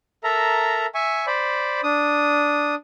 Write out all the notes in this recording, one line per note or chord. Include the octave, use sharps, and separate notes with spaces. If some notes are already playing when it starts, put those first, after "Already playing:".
A4 A#4 E5 A#5
E5 G#5 C#6
C5 D5 B5
D4 D#6